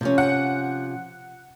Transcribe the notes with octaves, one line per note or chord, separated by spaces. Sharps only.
C3 F3 C#4
F#5